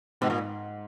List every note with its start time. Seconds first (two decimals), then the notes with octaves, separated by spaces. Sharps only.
0.21 G#2 B2
0.30 A#2